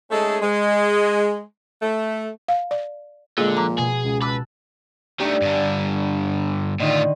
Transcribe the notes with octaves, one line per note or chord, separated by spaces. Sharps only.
G#3 A3 C#4 D#4 G#4 A4
G#3
A3
F5
D5
A#2 D3 G#3 G#4
F3 A5 A#5
B2 G#4
C#2
B4 A5 D6 E6 F#6
D#3 A3 D4 G4
G2 D3
A2 D3 D#3 D#4 F4